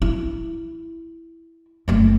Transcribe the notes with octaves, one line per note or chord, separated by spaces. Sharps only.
E4
F#1 A3